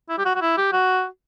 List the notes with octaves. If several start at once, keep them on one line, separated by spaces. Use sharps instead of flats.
E4
G4
F#4
F#4
E4
G4
F#4